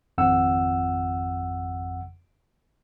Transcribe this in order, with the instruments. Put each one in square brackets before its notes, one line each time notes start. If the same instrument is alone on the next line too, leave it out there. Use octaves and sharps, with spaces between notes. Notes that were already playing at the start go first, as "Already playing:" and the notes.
[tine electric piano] G#1 F2 F#5 E6